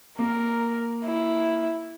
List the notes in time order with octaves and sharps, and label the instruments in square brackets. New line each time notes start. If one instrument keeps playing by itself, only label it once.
[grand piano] A#3 [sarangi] A#4
[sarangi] E4